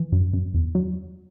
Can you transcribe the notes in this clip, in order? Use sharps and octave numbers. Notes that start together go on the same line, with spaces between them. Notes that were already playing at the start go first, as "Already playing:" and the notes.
Already playing: E3
F#2
F#2
E2
F#3